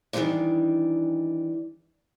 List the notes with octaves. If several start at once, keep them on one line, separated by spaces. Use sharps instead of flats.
D#3 E3 G3 A#3 C4 D4